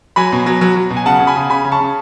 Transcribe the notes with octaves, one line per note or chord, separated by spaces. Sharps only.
F#3 G#5 B5
B2
F#3
F#3
F#3
B2
G#5
C#3 F#5 A5
C#3
G#5 B5
C#3
C#3 G#5 B5
C#3
A5 C#6
C#3